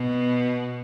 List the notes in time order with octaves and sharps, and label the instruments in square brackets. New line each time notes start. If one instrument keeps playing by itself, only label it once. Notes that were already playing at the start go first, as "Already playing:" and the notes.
Already playing: [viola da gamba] B2